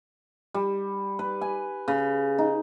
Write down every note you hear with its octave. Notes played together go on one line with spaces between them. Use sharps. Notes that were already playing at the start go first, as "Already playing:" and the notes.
G3
B4
G#5
C#3
D#4